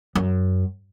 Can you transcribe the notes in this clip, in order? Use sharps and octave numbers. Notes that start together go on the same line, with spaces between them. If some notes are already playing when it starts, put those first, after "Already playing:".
F#2